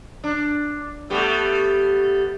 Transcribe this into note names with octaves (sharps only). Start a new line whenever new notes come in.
D4
G3 A3 B3